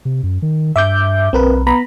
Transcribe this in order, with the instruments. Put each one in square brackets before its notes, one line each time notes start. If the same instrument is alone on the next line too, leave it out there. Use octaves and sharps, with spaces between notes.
[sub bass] C3
F#2
D#3
[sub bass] G2 [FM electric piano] E5 D6 G6
[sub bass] B1 [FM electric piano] C4 A#4 B4
[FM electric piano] B3 A#5 B5